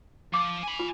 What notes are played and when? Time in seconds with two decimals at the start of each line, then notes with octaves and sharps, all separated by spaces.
0.34 F3 D6
0.63 G#5 B5
0.79 F4